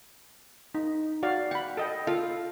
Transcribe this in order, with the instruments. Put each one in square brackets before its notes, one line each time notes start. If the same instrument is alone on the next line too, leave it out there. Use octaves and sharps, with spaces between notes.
[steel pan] D#4
F#4 D5 F5
[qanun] F#5 [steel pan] G5 B5
[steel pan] A4 D#5 G5
[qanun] F4 [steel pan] A4 F5